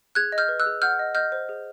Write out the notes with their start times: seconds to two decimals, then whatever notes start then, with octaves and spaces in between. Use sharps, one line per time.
0.15 G#4 F#6 G#6
0.32 D#5
0.38 F6 G6
0.49 B4
0.59 E6 F#6
0.66 G#4
0.82 F#5 F6 G6
0.99 D#5
1.15 D#5 F6 G6
1.32 C5
1.49 G#4